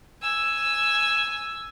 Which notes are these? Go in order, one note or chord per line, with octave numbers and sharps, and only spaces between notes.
G#5 E6